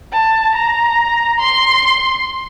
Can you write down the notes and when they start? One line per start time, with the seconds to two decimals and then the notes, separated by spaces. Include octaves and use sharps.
0.12 A5
0.55 A#5
1.40 C6